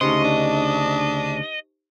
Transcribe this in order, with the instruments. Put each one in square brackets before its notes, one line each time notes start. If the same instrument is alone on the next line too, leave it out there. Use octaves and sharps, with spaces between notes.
[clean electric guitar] D2 C#3 [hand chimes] D#4 G4 C5 [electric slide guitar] D#5 [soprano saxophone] C6
[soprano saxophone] D4